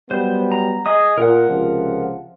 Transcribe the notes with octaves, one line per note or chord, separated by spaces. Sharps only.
F#3 G3 B3 C5
A#5
G#4 D#5 D#6
A#2 A#4 F#5
C#2 C3 F3